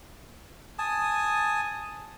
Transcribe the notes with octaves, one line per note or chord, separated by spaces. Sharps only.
G#5 A5 D#6